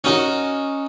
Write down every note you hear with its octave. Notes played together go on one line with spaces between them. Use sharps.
C#4 D#4 F#4 A#4